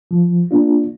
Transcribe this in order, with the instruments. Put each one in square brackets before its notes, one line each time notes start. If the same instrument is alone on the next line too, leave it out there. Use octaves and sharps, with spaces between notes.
[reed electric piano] F3
A#3 D4 F4